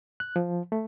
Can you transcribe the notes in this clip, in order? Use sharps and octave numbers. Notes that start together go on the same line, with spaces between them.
F#6
F3
A3